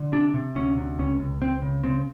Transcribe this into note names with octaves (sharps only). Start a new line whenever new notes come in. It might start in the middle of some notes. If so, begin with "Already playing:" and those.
Already playing: D3
C3 D4
C3
D2 C#4
C3
C#2 C#4
C#2
C#2 C4
C#3
C#3 C4